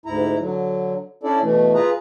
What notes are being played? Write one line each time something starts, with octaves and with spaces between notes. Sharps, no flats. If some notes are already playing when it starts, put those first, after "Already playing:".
D2 G#2 E4 A#5
D3 F#3
C#4 D4 E4 A4 D5
B2 E3 A3
F4 G#4 B4 A#5